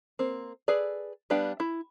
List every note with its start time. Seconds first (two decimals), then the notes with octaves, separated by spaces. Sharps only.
0.19 A#3 C4
0.68 G#4 A4 B4 D5
1.30 G3 B3 D4 F5 G5
1.60 E4